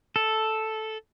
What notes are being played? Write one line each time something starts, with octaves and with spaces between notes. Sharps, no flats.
A4